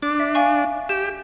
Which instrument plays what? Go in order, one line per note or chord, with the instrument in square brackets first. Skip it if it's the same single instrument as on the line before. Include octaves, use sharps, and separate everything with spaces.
[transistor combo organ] D4 [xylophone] D6
[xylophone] E5
F5 G#5 C#6
[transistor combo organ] G4 [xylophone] E7